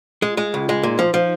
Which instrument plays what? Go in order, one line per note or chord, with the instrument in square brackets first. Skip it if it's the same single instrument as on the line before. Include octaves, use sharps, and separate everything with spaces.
[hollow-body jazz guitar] G#3 [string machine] F4
[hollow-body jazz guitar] G#3
C#2
G#3
[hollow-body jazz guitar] A#2 [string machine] D#4
[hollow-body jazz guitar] F3
F3